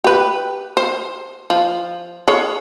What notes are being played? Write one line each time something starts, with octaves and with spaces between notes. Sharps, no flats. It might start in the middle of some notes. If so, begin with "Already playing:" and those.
G4 B4
C5
F3
G#4 A4 C#5